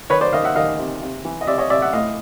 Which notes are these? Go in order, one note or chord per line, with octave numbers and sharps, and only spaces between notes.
D#3 B4 C#5
C5 D5
D#3 D#5 F5
E5 F#5
D#3 D#5 F5
C3
C3
E3
D#5
C3 D5 E5
C#5 D#5
C3 D5 E5
E5 F#5
A2 D#5 F5